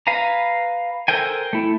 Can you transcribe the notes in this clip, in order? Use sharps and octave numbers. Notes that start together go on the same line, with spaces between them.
B4 F5 G#5 A#5
A4 A#4 C5 G5 G#5
A3 E4